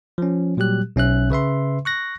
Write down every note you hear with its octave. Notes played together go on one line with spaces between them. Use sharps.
F3 C#4
A#2 F#3 G3 G4 F#6
B1 C#4 E5 F#6
C#3 B4 E5 C6
C#6 F#6 A#6